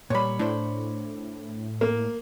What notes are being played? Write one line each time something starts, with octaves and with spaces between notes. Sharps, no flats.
A#2 G3 C#5 B5
A2 D4 C5
A#3